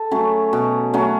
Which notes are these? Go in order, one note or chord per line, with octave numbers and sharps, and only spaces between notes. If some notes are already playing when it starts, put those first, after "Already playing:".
Already playing: A4
F#3 A3 C#4
B2
F#3 A3 C#4